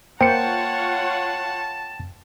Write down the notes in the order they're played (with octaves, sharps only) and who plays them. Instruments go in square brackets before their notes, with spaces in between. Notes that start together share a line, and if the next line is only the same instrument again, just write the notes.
[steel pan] A#3 C5 [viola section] F4 C#5 F#5 [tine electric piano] G5 C#7 [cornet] A5